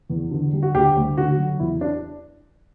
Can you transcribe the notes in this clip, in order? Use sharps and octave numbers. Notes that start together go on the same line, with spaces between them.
E2
D3
G3
F#4
D2 G4
D2
D3 F#4
F#3
E2 E4
D4